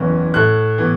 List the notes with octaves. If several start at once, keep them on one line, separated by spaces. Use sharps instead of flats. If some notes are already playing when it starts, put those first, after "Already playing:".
Already playing: F#1 E2 E3 C#4
A2 A3 E4 F#6
A2 E3 B3